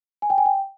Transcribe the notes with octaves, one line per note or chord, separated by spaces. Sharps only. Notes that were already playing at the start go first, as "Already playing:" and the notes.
G#5
G5
G#5
G5